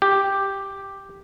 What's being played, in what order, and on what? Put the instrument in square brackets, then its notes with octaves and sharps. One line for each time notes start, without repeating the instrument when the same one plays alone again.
[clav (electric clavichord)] G4